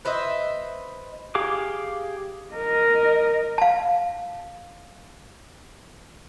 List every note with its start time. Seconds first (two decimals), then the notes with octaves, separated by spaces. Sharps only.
0.05 B4 C5 D#5 E5
1.35 G4 G#4 F5 D6
2.54 A#4 D#5
3.58 F5 A5